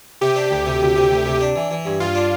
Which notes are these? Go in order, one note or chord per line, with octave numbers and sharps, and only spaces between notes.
C3 G4
D4
D2
C3
D2
C3
D2
C3
D4
E3
E3
G2
G2 F4
D4